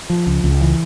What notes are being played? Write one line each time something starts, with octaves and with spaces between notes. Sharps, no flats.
F3
C#2
C#2
E3